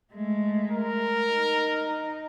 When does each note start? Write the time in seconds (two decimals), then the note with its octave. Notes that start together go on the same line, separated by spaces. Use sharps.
0.13 G#3 A3
0.71 A#4
1.31 D#4